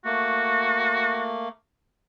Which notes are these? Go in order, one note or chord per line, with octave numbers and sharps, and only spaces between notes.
A3 A#3 F#4